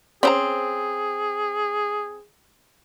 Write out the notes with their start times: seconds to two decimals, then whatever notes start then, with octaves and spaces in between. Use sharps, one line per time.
0.23 C4 C#4 G#4 C5 A#5